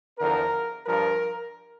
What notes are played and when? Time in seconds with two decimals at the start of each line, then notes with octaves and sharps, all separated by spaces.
0.18 E2 D3 F3 A#4
0.86 G2 F3 A#4